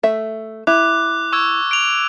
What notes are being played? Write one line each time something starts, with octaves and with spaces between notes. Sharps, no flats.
A3 E5
E4 D6 F#6
C#6 E6 G#6
D7 F7